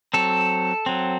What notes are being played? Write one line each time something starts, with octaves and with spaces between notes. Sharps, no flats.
F#3 C4 A4
F#3 C4